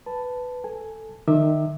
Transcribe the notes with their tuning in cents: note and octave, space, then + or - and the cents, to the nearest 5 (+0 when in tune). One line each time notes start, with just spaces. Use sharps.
B4 +10 A5 +0
A4 +10 G#5 +0
D#3 -25 E5 -15 D6 +20